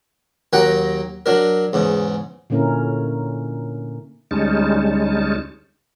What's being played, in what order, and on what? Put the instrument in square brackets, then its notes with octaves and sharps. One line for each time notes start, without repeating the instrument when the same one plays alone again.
[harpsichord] D#2 F#3 A#3 F#5 G5 A#5
F#3 D4 A#4
E2 G#2 C#3
[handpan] A#2 D3 A#3 C#4 E4 A#4
[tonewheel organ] D2 G3 G#3 C#4 D#4 A5